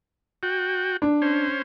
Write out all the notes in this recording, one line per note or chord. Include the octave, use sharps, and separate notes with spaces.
F#4 G5
D4
C#4 C5